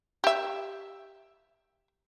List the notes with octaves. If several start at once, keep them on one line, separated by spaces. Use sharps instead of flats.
G4 E5